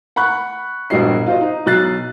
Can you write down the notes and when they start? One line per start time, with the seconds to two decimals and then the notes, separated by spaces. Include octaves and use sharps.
0.16 F#5 B5 C#6 F#6
0.90 E1 A#1 G2 F#4 D#5 C7
1.26 F4 F#4 C5 D#5
1.41 D#4
1.66 B1 F#3 F#6 A6 C7